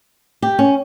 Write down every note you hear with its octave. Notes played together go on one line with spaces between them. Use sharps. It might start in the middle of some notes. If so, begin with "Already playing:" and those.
G4
C#4